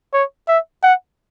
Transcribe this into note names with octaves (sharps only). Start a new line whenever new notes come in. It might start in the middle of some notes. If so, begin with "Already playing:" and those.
C#5
E5
F#5